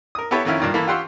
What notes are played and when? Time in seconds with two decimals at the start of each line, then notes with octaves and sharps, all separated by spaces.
0.15 A#4 D#6
0.31 B3 E4 G4 A4 B4 C#5
0.45 F2 D#3 C#4 E4 F5
0.60 G2 A#2 D#3
0.74 E3 A#3 A4 B5
0.87 F4 G4 F#5 C6 C#6 E6